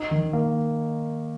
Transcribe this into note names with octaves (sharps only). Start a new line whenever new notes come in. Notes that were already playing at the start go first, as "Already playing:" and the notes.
Already playing: D#4
D#3
A#3